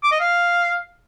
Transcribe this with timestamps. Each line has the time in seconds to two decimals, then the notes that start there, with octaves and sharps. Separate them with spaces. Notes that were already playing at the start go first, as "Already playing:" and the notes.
0.03 D6
0.12 D#5
0.20 F5